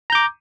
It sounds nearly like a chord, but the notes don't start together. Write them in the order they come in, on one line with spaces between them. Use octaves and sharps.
A#5 G6 D6